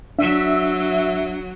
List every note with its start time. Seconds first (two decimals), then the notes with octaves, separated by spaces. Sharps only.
0.19 F#3 D4 E5